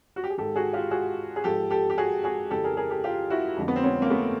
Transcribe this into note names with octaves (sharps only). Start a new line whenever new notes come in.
F#4
G4
G#4
G#2 D#3 G4 A4
F#4 G#4
F4 G4
F#4 G#4
G#4
G#2 F3 G4 A4
G4 A4
G4
F#4 G#4
F#4 G#4
F2 C#3 E3 G4 A4
G#4 A#4
G#4 A#4
G4 A4
F4 G4
E4 F#4
F2 D3 F3
B3
C4
B3 C#4
A#3
A3 B3